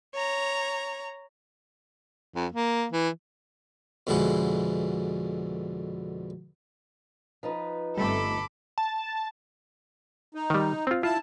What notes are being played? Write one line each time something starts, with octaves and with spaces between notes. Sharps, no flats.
C#5 A#5
F2
A#3
E3
F2 B2 D3 G#3 E4 F#5
F3 D#4 B4
G1 G3 A3 C4 A4 B5 D6
A5
D#4
D#3 G3
C4 F4
E4 F4 A5